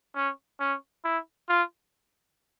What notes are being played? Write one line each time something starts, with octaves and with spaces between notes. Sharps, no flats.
C#4
C#4
E4
F4